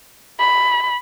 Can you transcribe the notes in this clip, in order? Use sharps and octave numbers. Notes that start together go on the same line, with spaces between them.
B5